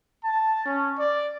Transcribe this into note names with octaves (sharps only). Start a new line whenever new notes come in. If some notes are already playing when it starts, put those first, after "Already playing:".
A5
C#4
D5